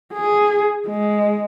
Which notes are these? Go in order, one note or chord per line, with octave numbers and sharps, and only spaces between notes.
G#4
G#3